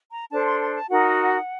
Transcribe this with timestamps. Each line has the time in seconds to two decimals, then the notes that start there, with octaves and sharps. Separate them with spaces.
0.12 A#5
0.32 D4 A4 C5 A5
0.46 C6
0.61 C6
0.75 A5
0.90 D#4 F#4 A#4 F#5